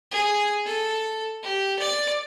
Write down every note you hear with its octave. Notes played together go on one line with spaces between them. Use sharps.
G#4
A4
G4
D5